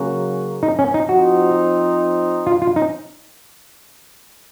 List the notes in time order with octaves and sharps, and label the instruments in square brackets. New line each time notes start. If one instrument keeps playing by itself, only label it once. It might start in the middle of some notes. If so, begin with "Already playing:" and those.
Already playing: [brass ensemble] C#3 F#3 A#3 C#4 F#4
[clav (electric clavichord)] D#4
C#4
D#4
[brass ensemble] F3 C4 D#4 [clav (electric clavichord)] F#4
[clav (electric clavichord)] F4
F4
D#4